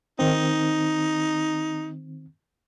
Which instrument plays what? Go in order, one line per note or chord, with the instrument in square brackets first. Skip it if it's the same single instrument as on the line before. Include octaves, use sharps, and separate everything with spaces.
[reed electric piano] D#3 C4 [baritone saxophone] D#4